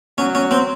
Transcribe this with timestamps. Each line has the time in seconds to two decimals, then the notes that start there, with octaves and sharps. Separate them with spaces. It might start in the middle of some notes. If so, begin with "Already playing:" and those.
0.18 F#3 C#4
0.35 C#4
0.51 C4